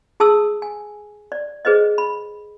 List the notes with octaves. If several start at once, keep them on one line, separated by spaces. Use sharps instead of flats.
G#4 A5 D#6 E6
G#5
D5
G#4 B4 C5 D#5
B5